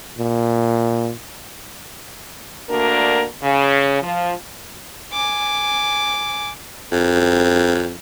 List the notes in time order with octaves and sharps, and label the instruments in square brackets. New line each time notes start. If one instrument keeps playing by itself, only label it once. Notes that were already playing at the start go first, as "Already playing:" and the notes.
[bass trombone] A#2
[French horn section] D2 A#3 D4 F#4 A#4
C#3
F3
[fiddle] G#5 D6
[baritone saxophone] F2